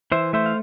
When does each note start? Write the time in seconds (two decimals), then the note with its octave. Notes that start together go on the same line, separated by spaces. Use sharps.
0.12 E3 C5 E5
0.33 A3 C5 E5
0.46 F5